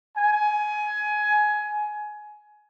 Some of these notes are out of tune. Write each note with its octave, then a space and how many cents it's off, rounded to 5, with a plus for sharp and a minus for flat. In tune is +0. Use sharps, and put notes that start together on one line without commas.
G#5 +20